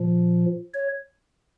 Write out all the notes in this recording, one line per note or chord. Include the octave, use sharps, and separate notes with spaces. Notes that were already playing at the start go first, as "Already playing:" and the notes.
Already playing: A#2 F3
C#5